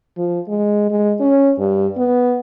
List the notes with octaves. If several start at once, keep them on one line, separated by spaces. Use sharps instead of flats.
F3
G#3
G#3
C#4
G2
B3